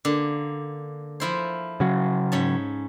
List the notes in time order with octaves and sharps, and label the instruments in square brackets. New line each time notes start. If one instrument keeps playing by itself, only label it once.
[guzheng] D3 A#3
F3 E4 C5
[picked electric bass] C#3 F#3
[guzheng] G#2 C#4 A5